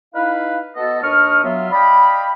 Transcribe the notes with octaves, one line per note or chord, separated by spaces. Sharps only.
D#4 E4 B4 F5
B3 F#4 A4 D#5
D#2 D4 D#5 C#6 D#6 F6
F#3 B3 F4 E5
D5 D#5 F5 G5 B5